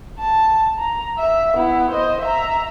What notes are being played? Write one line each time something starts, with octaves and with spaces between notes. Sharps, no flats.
A5
A#5
E5
B3 E4
C5 D#5
E5 A#5